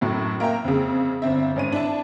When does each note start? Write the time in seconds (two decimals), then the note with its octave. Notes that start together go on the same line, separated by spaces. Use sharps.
0.01 F#2 A2 F#3
0.40 A#3 A#4 E5 G5
0.64 F2 C#3
1.22 G1 C4 E5
1.56 G#1 C#4 D#7
1.72 D4 E4 A5